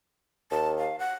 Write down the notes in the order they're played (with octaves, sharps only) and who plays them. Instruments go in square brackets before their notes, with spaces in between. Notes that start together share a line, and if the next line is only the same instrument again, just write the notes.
[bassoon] D#2 [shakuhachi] A5
[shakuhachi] F5
F#5